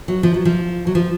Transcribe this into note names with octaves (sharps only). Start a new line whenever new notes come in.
F#3
F3
F#3
F3
F#3
F3